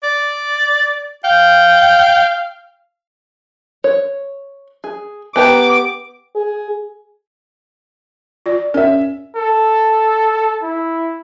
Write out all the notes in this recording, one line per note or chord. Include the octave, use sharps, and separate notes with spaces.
D5
F5 G5
C#5
G#4
B3 G4 A#5 D6
G#4
F4 D5
C#4 A#4 E5
A4
E4